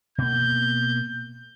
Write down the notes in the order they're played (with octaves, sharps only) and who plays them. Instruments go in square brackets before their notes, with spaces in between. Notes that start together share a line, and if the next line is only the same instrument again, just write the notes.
[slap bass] B2 A#3 [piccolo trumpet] G6